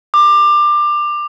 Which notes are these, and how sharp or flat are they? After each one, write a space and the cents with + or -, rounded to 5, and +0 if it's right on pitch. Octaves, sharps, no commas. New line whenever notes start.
D6 +20